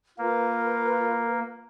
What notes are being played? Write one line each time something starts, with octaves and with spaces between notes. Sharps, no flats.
A#3 F4 A#4 B4